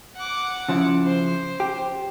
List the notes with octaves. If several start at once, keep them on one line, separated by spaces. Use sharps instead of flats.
F#5 D6
C#3 F3 E4
C5
G4